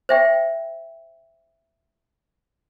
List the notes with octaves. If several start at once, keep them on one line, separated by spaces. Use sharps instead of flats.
C5 E5 G5